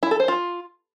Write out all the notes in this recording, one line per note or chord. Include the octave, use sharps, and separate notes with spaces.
E4
A4
C5
F4